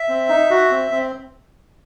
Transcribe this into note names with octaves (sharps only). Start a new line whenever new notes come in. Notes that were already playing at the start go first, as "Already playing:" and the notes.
Already playing: E5
C4
D#4
F#4
C4
C4